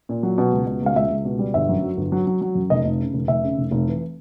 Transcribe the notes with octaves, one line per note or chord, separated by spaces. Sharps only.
A#2
F#3
B2
C#2
B2
C#2 F5
C#2 E5
C#2
B2
G3
G1 E5
F#2
F#3
G1
F#3
F#3
F#3
F#2
F1 D#5
F1
C#3
F1
F1 E5
C#3
F1
F1
E3